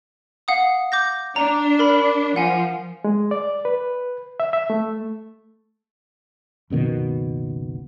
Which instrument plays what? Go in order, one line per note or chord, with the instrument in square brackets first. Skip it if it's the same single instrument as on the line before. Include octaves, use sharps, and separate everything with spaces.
[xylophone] F5 F#5 D#6
D6 G6 A#6
[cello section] D4 [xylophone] A#5
[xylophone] A#4 B5
[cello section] F3 [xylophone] F#5 G#5
[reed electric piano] G#3
D5
B4
E5
E5
A3
[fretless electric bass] F#1 C#2 B2 D#3